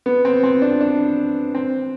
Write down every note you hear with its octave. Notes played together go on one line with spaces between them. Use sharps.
B3
C4
C4
D4
D4
C4